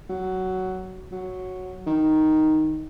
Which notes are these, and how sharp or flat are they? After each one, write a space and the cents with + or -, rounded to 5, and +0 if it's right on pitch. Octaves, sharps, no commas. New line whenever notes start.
F#3 +10
F#3 -5
D#3 +0